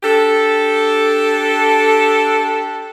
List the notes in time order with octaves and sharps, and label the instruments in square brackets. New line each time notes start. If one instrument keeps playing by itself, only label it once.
[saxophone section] D4 G4 A4